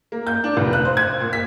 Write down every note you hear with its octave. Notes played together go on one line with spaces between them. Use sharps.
A#3
G6
D4
F1
F#6
C5
G#6
A#2
B6